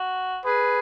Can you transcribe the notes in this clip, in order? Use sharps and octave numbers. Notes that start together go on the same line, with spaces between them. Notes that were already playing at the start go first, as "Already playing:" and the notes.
Already playing: F#4
G#4 B4